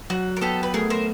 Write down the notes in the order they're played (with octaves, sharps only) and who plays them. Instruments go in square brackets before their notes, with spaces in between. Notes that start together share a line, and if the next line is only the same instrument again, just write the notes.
[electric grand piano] F#3 [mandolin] F#4
[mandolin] A#4
[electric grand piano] B3 [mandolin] G4 A4
[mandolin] B4
[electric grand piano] A3 [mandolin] G#4 A#4
[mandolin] A#4 C5